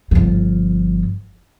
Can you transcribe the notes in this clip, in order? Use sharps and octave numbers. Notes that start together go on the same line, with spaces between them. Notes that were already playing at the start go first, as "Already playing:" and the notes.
G1 F3